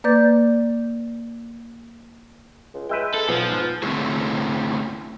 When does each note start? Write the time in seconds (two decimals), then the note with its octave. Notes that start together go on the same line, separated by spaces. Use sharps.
0.04 A#3 B4 D5 D6 G6 A6
2.74 C#2
2.89 G#3 B4 E5 G5
3.14 A4
3.29 B1 F3 B3
3.50 G#2
3.83 D3 A3 C4 C#4 E4 G#4